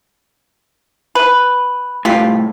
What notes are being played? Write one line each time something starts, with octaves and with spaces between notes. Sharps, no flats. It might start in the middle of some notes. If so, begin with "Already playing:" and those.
B4
C2 A2 F4 G4